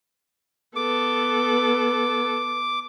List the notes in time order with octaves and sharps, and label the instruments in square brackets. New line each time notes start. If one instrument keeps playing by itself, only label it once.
[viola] B3 A4 [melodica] D6